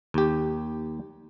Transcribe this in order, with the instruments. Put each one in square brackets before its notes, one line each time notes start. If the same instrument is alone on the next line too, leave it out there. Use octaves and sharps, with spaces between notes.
[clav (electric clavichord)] D#2 G4